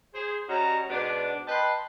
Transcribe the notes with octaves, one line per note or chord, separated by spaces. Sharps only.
G#4 C5
G3 C#4 F#4 D#5 A#5
G#2 B2 B3 D4
B4 D#5 G5 A5 B5 C6